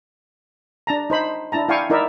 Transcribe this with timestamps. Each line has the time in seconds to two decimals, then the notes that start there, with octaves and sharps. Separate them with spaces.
0.87 D4 A5 A#5
1.10 D#4 C5 B5
1.52 D4 E4 A5 A#5
1.69 E4 D5 F5 G5 G#5 C#6
1.90 D#4 E4 A#4 D5 E5